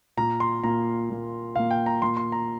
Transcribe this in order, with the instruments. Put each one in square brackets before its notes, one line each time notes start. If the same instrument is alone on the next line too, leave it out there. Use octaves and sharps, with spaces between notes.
[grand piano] A#2 A#3 A#5
C6
A#2 A#3 A#5
A#2 A#3
A#2 A#3 F5
G5
A#5
A#2 A#3 C6
C6
A#5